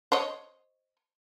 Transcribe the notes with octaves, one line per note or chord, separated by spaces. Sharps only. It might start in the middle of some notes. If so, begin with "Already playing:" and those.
C5 C#5 D#5